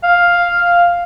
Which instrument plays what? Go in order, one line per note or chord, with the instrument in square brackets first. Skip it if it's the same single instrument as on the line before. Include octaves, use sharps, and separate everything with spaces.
[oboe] F5